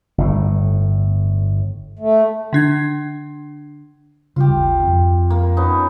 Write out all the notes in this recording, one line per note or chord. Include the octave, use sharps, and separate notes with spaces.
G1 A2
A3
D3 D4 G#6
C#3 G3 F4 G4
G#1 D#2
F2 C4
A#3
B3 C#4 D#4